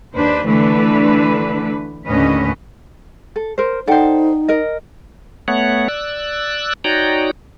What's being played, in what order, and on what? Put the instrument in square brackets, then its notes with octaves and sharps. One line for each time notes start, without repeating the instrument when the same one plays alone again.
[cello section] D#2 D4 B4 C5
D3 E3 A3 B4
D#2 A2 D3 C#4 B4 D#5
[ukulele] A4
A#4 C5
[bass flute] D#4 [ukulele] A4 C5 [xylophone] D5 F#5 G5
[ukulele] A#4 D#5
[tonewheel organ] A3 B3 C#5 F#5
D5 E6 F#6
D#4 F#4 C#5 D5 G5 A#5